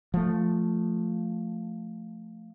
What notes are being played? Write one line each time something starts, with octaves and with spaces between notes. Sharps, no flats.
F3 A3